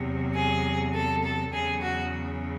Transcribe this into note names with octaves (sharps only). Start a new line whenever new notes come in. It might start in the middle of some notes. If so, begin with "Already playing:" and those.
Already playing: E2 C3 F#3
G#4
A4
A4
E2 C#3 F#3 G#4
F#4